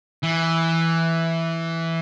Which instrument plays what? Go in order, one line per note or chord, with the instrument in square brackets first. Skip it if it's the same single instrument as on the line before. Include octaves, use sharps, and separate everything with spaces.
[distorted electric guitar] E3